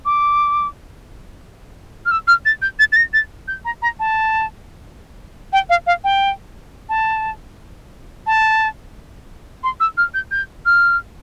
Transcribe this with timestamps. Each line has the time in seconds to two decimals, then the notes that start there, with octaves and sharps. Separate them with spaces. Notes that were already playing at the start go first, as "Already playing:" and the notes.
0.05 D6
2.06 F6
2.11 E6
2.28 F6
2.45 A6
2.62 G6
2.79 A6
2.92 A6
2.96 A#6
3.13 A6
3.48 G6
3.65 A#5
3.82 A#5
3.99 A5
5.53 G5
5.70 F5
5.87 F5
6.04 G5
6.89 A5
8.27 A5
9.63 C6
9.80 E6
9.97 F6
10.14 G6
10.31 G6
10.66 F6